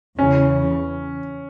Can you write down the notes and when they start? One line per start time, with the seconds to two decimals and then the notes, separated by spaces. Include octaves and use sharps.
0.19 E2 C#3 E3 C#4